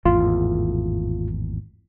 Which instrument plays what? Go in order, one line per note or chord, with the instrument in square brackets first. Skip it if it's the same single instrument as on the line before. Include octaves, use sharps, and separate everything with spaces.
[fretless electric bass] G#1 E2 A2 [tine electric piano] F4